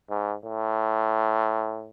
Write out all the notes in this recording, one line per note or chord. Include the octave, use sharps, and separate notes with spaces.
G#2
A2